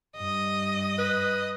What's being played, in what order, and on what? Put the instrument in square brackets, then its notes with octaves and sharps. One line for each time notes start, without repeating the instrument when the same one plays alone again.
[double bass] G2 [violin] D#5
[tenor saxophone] B4